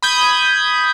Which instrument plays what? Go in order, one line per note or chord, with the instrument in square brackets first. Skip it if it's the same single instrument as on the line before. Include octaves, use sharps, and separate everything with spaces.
[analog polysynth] B5 D#6 G6 G#6